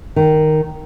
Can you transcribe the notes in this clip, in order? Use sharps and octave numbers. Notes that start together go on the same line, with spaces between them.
D#3